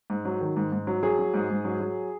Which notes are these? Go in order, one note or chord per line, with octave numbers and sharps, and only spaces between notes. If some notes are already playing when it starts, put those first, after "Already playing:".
G#2
F#3
D#3
G#2
G#2
F#3
F#3 G#4
F#3
G#2
G#2
F#3
F#3